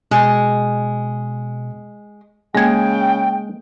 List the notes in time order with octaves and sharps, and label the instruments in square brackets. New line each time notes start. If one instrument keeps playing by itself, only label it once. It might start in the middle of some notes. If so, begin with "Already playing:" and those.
[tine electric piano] B2 [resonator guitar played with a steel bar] G#3
[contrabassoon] C#3 [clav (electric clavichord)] G#3 G#4 [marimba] A#3 G#6 [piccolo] G5